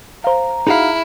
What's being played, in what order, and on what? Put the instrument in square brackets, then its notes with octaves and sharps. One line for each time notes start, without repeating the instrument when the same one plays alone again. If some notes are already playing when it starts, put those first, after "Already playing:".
[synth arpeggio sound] C5 F5 [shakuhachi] A#5
[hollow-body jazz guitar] D#4 F#4 F5 [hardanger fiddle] E4 [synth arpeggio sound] G#4 F6